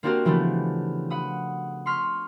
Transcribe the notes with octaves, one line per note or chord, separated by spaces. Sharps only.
A#3 C4 D4 F#4 G4 A#4
C#3 E3 F3 A3 B3 D4
F#5 B5 D#6
C6 C#6 F6 B6